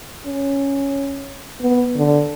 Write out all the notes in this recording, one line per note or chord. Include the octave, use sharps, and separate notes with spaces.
C#4
B3
D3